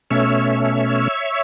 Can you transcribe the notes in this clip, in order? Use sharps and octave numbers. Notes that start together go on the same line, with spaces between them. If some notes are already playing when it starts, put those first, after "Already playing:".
B2 A3 C#4 C#5 E5